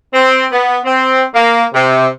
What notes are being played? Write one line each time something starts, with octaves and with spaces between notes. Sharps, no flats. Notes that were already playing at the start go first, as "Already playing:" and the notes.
C4
B3
C4
A#3
C3